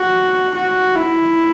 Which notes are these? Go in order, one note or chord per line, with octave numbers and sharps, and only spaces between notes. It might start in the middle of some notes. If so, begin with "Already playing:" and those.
Already playing: F#4
F#4
E4